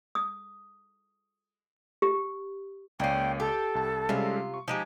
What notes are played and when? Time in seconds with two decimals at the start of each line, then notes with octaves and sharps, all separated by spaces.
0.15 D#6
2.02 G4
3.00 C#2 A#3 C#4 D5 G5 C7
3.40 G4 A4
3.75 C2 A5
4.09 C3 G3 G#3 C#4 F4
4.54 C#6
4.68 F3 G#3 D#4 G4 A#5